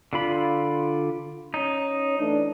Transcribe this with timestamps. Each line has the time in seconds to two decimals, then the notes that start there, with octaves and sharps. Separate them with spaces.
0.13 D3 F4 B5
1.54 C#4 D#4 C#5
2.19 E3 A3 D4